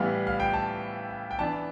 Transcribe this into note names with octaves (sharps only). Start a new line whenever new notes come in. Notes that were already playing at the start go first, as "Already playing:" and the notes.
Already playing: A2 E3 G3 B3 F5
F5
G5
A5
G5
E3 B3 D4 A5